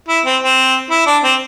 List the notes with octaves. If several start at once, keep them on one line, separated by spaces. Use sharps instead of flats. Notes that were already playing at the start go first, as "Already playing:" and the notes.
E4
C4
C4
E4
D4
C4